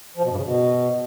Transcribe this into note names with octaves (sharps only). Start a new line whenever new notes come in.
F3
B2
G2
C#3
B2